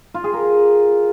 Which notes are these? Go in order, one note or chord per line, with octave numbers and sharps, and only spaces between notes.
F4
G#4
A#4